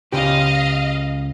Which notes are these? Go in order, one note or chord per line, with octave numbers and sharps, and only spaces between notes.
C#2 C#3 G4 D#5 F5